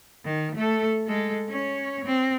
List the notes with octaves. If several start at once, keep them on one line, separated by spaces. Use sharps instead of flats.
D#3
A3 A4
G#3 A4
C#4 C#5
C4